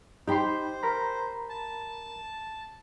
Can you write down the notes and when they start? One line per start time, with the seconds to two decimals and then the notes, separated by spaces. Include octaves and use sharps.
0.27 D#4 G4 C5 G5 B5 C6
0.83 A#4 A#5 B5
1.49 A5